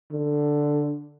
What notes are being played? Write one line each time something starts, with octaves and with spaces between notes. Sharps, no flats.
D3